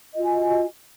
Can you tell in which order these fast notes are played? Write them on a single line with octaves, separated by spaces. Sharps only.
D#5 F4 F#4 G#5